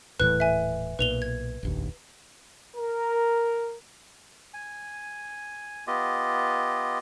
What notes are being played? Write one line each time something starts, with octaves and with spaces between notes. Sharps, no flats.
D#1 A2 E3 B4 F#6
E5 G#5
B1 A#2 B4 F7 G7
G#6
F1 A#1 D#2
A#4
G#5
B3 F4 G4 D#5